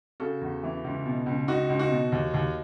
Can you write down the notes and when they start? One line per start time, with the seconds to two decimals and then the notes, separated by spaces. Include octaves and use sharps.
0.20 C#3 F#4 A4
0.41 E2
0.63 E3
0.84 C#2
1.06 B2
1.26 C#2
1.48 C#2 D#4 F#4
1.70 C#2
1.79 D#4 F#4
1.90 B2
2.12 D#2
2.34 D#2